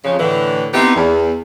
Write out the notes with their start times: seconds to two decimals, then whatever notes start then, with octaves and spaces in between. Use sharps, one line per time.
0.05 F2 C#3
0.20 A2 D3 E3
0.74 B3 C4 D#4 E4 G4 B4
0.96 E2